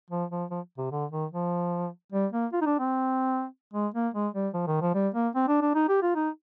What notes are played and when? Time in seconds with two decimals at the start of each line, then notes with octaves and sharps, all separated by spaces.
0.10 F3
0.30 F3
0.50 F3
0.78 C3
0.91 D3
1.11 D#3
1.31 F3
2.12 G3
2.32 A#3
2.53 F4
2.61 D#4
2.66 D4
2.79 C4
3.73 G#3
3.94 A#3
4.14 G#3
4.34 G3
4.54 F3
4.67 D#3
4.81 F3
4.94 G3
5.14 A#3
5.35 C4
5.48 D4
5.61 D4
5.75 D#4
5.89 G4
6.02 F4
6.15 D#4